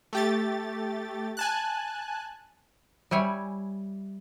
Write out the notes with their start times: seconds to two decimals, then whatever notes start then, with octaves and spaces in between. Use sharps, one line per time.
0.13 A3 G4 A6
1.37 G#5 A5 F#6
3.11 G3 E4 C#5 G#5